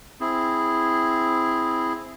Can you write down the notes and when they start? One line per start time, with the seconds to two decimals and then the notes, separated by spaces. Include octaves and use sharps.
0.21 C4 E4 G#4